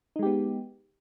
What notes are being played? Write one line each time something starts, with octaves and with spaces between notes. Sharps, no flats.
G#3 B3 D#4 G4